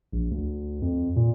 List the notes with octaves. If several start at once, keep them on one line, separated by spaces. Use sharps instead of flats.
A#1
D2
F2
A#2